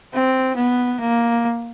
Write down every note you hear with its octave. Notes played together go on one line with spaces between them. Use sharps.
C4
B3
A#3